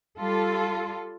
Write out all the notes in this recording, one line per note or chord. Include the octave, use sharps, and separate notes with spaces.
G3 F4 A4